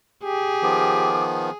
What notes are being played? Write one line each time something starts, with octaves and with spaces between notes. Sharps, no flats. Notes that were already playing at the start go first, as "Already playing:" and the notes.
G4 G#4
D#3 F3 B3 D6